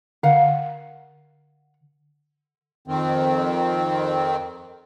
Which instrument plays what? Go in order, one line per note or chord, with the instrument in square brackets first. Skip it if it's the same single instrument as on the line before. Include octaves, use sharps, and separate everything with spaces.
[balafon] D3 [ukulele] F5 F#5
[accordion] F2 D#3 C4